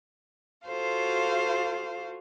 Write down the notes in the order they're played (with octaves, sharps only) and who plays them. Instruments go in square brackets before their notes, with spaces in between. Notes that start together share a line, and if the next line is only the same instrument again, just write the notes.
[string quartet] F4 F#4 A4 C5 F5